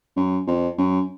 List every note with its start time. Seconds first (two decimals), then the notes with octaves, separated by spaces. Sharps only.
0.16 F#2
0.47 F2
0.78 F#2